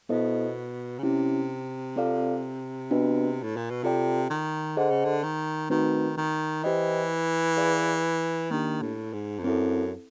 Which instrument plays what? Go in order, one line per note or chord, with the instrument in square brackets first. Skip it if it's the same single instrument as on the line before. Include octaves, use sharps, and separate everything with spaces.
[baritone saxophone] B2 [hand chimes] B3 E4 A4 C5 D#5
[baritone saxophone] C#3
[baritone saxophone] C3 [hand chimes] C#4 E4 G4
[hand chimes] C4 F4 A4 D5 F5
B3 D4 F#4 B4 D#5
[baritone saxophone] A2
A#2
B2
[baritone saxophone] C3 [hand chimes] F4 A4 D5 G5
[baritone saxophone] D#3
[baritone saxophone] D3 [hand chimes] G#4 C5 D#5 F#5
[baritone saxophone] C#3
D3
D#3
[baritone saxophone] D#3 [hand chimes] A3 C4 D#4 F#4 B4
[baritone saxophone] D#3
[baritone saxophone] E3 [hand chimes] E4 G4 C5 D#5 G5
[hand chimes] G#4 B4 D5 F5
[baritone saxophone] D#3 [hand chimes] A#3 D4 G4
[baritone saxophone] A2
G#2
F2
[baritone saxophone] F#2 [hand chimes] C4 E4 A4